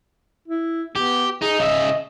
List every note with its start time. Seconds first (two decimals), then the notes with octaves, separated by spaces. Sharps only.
0.48 E4
0.96 B3 G4
1.42 D#4 G#4
1.59 C#3 D#5 E5